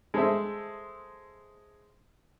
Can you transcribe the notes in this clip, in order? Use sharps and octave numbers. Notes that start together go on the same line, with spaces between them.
G#3 A4 C5 E5